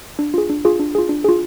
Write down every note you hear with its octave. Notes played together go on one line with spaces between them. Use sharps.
D4
F4 G#4
D4
F4 G#4
D4
F4 G#4
D4
F4 G#4